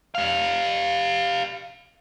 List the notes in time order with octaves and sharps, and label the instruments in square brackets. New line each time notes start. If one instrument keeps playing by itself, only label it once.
[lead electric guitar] G4 F5